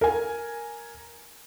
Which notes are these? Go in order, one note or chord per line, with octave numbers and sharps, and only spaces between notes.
A#4 G#5